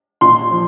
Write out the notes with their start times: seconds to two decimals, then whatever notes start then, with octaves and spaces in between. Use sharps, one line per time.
0.21 A#2 C6
0.51 F3